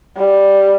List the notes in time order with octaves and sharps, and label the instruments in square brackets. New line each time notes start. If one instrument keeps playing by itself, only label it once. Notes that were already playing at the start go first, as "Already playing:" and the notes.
[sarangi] G3